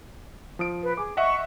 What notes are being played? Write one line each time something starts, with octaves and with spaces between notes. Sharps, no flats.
F3 D#6 D7
B4
G#4 D6
D#5 E5 F#5 C#6